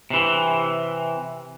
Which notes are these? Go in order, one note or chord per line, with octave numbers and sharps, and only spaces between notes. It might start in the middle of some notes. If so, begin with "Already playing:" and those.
C3 E3